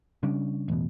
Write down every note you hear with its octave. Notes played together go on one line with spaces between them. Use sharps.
C#3 G3 C#4 D4
A1 E2 B2